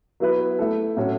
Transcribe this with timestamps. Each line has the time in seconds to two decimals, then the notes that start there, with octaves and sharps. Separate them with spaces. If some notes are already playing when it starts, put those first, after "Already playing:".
0.20 F#3 B3 E4 B4
0.59 A3 E4 A4
0.97 A2 F#3 C#4 F#4 A4